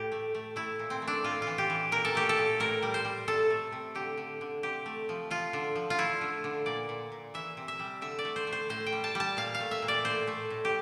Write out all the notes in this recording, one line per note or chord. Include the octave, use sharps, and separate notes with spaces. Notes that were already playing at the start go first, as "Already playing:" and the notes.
Already playing: A2 G4
A3
A3
A3 E4
A#2
C4
A3
D4
A2 F4
F4
E3
G4
E3
A#2 A#4
A4
A3 G4
A4
A#2
A2 A#4
G3
C5
G3
C3 A4
A3
C3
D3 G4
D3
D3
C3 G4
A3
F3
F3 F4
D3
F3
F4
A3 E4
D3
D3
A#2 D5
A#2
A#2
E3 E5
C3
E5
G3
D3 E5
D5
A3
C5
A3
C5
A2 C5
G5
G3
A5
G3 A5
A#2 F5
F5
A3
E5
A#2
D5
A2 C5
A3
A2
G4